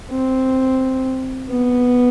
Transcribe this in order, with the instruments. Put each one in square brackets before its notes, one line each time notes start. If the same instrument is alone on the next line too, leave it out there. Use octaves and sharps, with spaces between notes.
[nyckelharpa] C4
B3